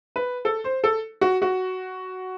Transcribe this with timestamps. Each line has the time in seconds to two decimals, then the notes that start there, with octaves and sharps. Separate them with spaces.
0.16 B4
0.45 A4
0.64 C5
0.84 A4
1.21 F#4
1.42 F#4